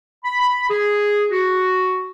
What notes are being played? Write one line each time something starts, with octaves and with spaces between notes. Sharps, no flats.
B5
G#4
F#4